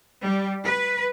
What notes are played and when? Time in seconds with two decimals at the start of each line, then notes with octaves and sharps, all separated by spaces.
0.23 G3
0.64 B4